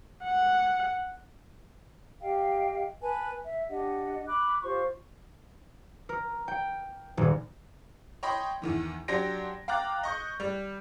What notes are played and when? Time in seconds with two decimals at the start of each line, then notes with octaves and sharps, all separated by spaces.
0.25 F#5
2.21 G4 D#5 F5 G5
3.03 B4 G#5 A5
3.44 E5
3.69 D4 G4 D#5 F#5
4.27 B5 D6 F#6
4.63 F4 G4 C5 C#6
6.09 A#4
6.48 G5
7.17 D#1
8.23 C#5 D#5 G5 B5 C6
8.62 E2 D#3 E3
9.08 F#3 D4 G4 C6 A#6 D7
9.68 F5 G5 A#5 D6 F#6 A6
10.03 D#5 C#6 G6
10.40 G3